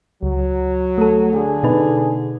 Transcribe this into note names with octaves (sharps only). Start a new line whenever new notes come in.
C#2 F#3
A3 A4
D3 G#4
B2 D#4 B4